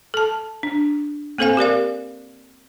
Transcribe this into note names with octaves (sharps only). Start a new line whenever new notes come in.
A4 A5
D4
A#3 C4 A4 C5 F5 G#5
G4 A#4 D5 F5